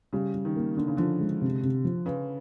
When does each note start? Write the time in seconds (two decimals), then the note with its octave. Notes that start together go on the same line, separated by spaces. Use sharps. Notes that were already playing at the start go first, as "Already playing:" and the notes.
0.13 C#3 G3
0.35 G3
0.45 D#3
0.56 A#3
0.77 D3 D4
0.87 C#3
0.97 D3 F3
1.20 G#3
1.41 C3
1.63 C3
1.85 F3
2.06 C#3 B4